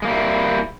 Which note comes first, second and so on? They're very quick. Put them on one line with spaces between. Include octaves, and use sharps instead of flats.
G#3 A#3 G3 E4